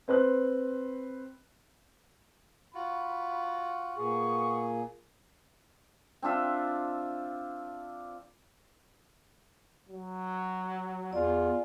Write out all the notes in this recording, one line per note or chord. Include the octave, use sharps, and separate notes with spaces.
C4 B4 C5 F#6
F4 F#4 B5
A#2 B3 G#4 C#6
C4 D4 F4 E5
F#3
E2 F4 D5 G#5